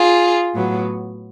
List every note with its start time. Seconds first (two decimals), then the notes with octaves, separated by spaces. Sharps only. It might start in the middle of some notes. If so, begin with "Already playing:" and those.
Already playing: F4 G#4
0.54 A2 F#3 B3